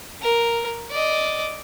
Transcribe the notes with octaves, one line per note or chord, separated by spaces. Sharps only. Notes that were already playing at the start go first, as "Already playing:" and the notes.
A#4
D5 D#5